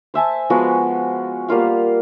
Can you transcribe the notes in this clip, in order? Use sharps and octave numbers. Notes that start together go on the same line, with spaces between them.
C5 E5 G#5 A5
F3 G#3 B3 F#4
G3 A#3 F4 F5